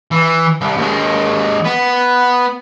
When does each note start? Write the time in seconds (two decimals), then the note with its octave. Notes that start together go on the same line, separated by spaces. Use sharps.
0.11 E3
0.61 C2
0.77 D#2 G#3
1.65 B3